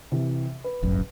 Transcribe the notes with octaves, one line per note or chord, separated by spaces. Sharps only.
C3 E3
B4
D1 G1 F#2